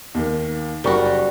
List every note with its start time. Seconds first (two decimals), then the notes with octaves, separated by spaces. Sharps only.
0.15 D#2 D#3
0.84 F#1 G3 F#4 A#4 C#6